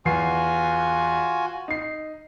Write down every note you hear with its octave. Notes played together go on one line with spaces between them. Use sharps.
E2 F4 F#4 G#5 C7
D#4 C7